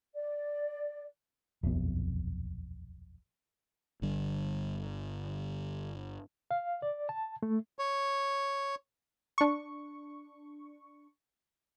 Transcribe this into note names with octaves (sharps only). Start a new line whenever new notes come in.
D5
D#1 B1 F2 B3
G1 D3 G3
F5
D5
A5
A3
C#5
D4 C#6